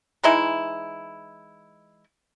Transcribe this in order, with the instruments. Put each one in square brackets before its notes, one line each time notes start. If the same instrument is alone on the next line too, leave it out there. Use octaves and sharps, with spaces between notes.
[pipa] E3 G#3 D#4 E4